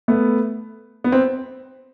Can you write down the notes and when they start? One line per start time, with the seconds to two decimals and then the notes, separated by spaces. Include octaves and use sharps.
0.08 A3 B3
1.04 B3
1.12 C4